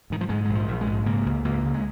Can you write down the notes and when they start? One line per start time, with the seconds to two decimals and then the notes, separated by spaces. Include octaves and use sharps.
0.10 G#2 D#3
0.21 F3
0.29 G#2 G#3
0.45 A#1 G#3
0.55 F3
0.68 A#1
0.81 G#3
0.87 G#2
1.06 C#3 A#3
1.26 C#2
1.44 C#2 A#3
1.65 C#3
1.74 G#3